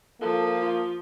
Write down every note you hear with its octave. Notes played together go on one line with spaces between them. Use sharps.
F3 A#3 A4
F4